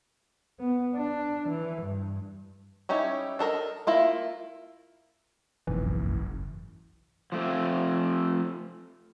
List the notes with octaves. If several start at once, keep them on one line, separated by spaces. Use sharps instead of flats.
B3
D4
E3
G2
G3 C#4 D#4 E4 C#5
D4 A4 A#4 D#5
A#3 E4 F4 A#4
F#1 B1 F2 G#2 E3
F3 A3 C4